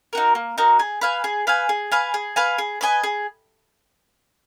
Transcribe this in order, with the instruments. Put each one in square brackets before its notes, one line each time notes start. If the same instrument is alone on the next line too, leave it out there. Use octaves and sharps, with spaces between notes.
[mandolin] D#4 F#4 A#4
A#3
D#4 F#4 A#4
G#4
B4 F5 G#5
G#4
B4 F5 G#5
G#4
B4 F5 G#5
G#4
B4 F5 G#5
G#4
B4 D#5 G#5
G#4